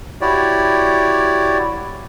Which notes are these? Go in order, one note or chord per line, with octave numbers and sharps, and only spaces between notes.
E4 F#4 G4 C#5 D5